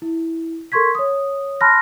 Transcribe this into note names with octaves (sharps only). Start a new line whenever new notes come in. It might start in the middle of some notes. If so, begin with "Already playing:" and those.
E4
A4 A#4 C6 C#6 G#6 B6
C#5 D#6
A5 B5 C6 F6 F#6 A#6